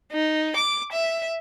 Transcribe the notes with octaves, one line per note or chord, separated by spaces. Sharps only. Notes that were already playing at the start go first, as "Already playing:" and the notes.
D#4
D6
E5